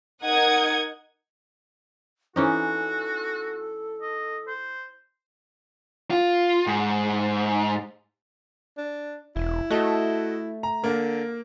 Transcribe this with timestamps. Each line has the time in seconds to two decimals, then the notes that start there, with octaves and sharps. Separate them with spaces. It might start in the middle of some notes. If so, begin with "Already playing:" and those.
0.24 D#4 A#4 F#5 D#6 G#6
2.36 E3 C#4 D#4 F#4 A4
4.01 D#5
4.47 C5
6.11 F4
6.67 G#2
8.78 D4
9.36 E1 E4
9.70 A3 F#4 A4 D#5
10.63 A#5
10.84 D3 A#3